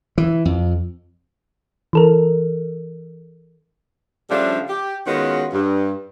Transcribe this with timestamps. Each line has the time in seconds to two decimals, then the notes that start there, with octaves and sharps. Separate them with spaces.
0.18 E3
0.45 F2
1.93 E3 A4 A#4
4.30 C#3 F3 G3 A3 D4
4.69 G4
5.07 D#3 G#3 B3 C#4 F4 F#4
5.53 G2